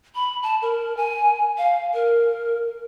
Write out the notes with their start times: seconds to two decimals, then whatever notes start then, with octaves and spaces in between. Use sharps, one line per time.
0.15 B5
0.43 A5
0.62 A#4
0.97 G#5
1.58 F5
1.94 A#4